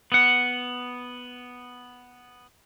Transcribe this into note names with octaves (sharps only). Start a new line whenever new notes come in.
B3 F#5